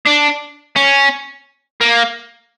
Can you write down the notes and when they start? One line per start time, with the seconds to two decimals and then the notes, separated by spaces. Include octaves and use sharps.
0.06 D4
0.76 C#4
1.81 A#3